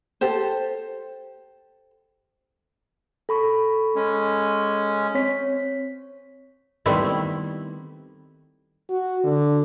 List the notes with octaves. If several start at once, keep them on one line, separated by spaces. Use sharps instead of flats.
G4 A4 C5
A4 B5 C#6
G#3 C#4
C4 C#5 B6
D#3 G3 A3 B3 C4 E4
F#4
D3